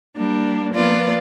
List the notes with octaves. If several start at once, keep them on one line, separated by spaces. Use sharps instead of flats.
G3 A#3 D4
F3 A#3 B3 F4 D5